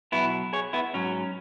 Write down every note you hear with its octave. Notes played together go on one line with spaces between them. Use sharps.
B2 F#3 B3 E4
G#4 C#5
B3 E4
G#2 F#3 C#4